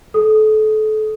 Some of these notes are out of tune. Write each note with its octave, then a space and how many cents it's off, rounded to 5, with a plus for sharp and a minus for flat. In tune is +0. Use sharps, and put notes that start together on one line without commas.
A4 -30 D#6 +0